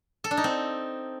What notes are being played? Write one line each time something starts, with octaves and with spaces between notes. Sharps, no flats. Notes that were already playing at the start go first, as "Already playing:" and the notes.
A4
D4
D#4
C4